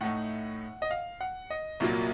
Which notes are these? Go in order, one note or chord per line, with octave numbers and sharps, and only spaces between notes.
A2 A3 D#4 F#5
D#5
F5
F#5
D#5
C2 A#2 F#3 A#3